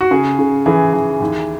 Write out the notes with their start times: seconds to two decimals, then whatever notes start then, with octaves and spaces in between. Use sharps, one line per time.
0.01 F#4
0.11 C#3 G#4
0.39 C#3
0.66 E3 G#4
0.94 E3
1.21 D#2